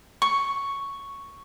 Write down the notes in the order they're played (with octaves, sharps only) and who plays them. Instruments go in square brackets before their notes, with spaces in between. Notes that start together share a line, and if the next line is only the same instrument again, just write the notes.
[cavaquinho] C#6